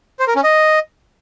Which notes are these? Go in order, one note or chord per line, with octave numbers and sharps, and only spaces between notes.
C5
A#4
C#4
D#5